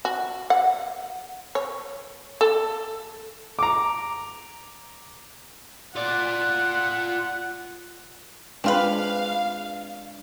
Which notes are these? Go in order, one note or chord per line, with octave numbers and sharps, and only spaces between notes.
F#4
F#5
C#5
A4
A#5 D6
F4 D5 F#5
G#3 C4 D4 F4 B4 F5